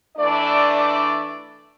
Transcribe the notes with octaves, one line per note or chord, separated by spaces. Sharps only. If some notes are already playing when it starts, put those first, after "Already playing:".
E3 A3 D4 D5
D5